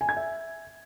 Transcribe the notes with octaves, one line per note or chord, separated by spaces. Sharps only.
G#5
G#6
E5